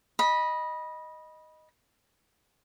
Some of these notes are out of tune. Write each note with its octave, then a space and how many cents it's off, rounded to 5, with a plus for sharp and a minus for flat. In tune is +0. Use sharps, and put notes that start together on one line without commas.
D#5 +0 B5 -20